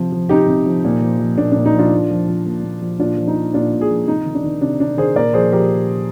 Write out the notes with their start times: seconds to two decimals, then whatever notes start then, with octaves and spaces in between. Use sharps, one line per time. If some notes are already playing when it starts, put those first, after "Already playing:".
Already playing: C3 F3
0.12 F3
0.29 C3 D#4 G4
0.47 C3
0.66 F3
0.84 A#2
1.02 F3
1.19 F3
1.37 A#2 D4
1.52 A#2 D4
1.65 D#4
1.74 F3 D4 F4
1.92 A#2
2.10 F3
2.28 F3
2.45 A#2
2.63 A#2
2.81 F3
2.99 A#2 D4 F4
3.17 F3
3.27 D#4
3.36 F3
3.53 A#2 D4 F4
3.72 A#2
3.80 F4 G#4
3.90 F3
4.07 C3 D#4
4.25 D#3
4.35 D4
4.44 D#3
4.61 C3 D4
4.79 C3 D4
4.97 D#3 G#4 C5
5.15 A#2 A#4 D5
5.34 F3 G#4 C5
5.52 F3 G4 A#4